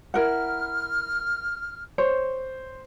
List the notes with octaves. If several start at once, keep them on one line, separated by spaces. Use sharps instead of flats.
E4 A#4 F#5 F6
C5 C#5